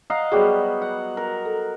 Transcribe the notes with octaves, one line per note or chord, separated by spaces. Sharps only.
D#5 F5 F#5 A#5
F#3 G3 B3 G#4
F#5
A#4
A4